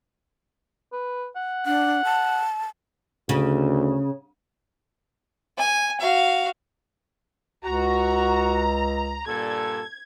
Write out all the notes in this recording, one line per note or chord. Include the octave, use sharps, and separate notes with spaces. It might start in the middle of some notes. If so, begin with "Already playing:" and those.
B4
F#5
D4 F#5
A5
D2 C#3
G#5
F#4 F5
C#2 F#4 A#5
G2 A#2 A4 G#6